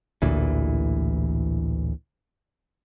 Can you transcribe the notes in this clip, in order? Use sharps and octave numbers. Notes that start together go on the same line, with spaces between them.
A1 D2 A#2 E3